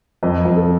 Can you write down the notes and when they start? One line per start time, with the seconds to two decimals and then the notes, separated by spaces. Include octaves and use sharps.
0.23 F2 D#5
0.45 F2
0.57 A4